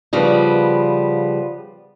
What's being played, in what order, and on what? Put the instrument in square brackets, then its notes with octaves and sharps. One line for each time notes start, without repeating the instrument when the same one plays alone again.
[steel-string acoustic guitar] C#3 F3 G3 B3